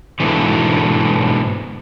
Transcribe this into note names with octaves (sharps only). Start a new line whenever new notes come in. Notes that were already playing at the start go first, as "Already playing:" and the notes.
G#2 B2 D3 E3